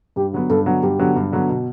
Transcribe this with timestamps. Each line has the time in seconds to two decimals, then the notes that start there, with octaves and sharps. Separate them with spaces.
0.16 G2 G4
0.33 D3 F#3 B3
0.50 G2 A4
0.66 D3 F#3 B3
0.83 G2 G4
0.99 D3 F#3 B3
1.16 G2
1.32 D3 F#3 B3
1.49 B2